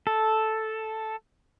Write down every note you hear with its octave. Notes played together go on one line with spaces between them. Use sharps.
A4